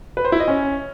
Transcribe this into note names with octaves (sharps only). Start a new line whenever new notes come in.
B4
C5
E4
D#5
C#4